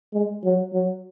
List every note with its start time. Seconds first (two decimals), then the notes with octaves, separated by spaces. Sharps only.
0.13 G#3
0.44 F#3
0.73 F#3